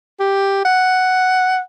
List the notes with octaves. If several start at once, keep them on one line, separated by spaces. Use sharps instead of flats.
G4
F#5